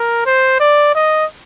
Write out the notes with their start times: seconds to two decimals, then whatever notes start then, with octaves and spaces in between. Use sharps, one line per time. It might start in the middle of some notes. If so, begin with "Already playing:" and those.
Already playing: A#4
0.26 C5
0.60 D5
0.95 D#5